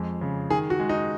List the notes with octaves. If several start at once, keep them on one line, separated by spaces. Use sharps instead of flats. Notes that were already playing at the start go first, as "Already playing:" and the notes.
Already playing: F2 G#3
C#3
D#3 G#4
F#4
G#3
D#4